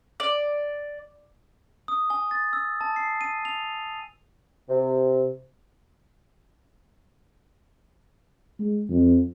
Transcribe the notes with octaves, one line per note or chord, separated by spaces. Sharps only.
D5
D#6
G#5
A6
E6
A5
C7
D#7
F7
C3
G#3
F2